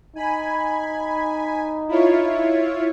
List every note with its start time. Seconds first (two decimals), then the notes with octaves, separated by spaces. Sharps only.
0.15 D#4 G#5 B5
1.89 E4 F4 C#5